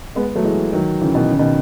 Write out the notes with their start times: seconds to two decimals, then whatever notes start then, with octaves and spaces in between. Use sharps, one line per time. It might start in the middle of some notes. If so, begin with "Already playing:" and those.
0.16 G#3 B3
0.35 F#3 A3
0.44 E3 G#3
0.73 D#3 F#3
1.01 C#3 E3
1.15 B2 D#3
1.31 C#3
1.39 B2 D#3